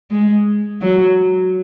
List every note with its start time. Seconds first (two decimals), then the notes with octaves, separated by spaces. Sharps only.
0.11 G#3
0.81 F#3